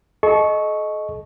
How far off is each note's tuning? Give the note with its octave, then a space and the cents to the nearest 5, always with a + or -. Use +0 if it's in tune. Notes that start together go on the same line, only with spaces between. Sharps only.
A4 -40 D#5 +0 C#6 +0